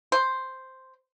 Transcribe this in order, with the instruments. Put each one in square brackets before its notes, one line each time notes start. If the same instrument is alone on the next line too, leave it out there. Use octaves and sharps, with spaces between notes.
[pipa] C5